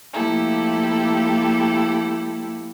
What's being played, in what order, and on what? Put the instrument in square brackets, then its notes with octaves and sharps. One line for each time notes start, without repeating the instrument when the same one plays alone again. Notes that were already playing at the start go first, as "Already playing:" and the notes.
[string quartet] F3 A3 A#3 E4 G4 A4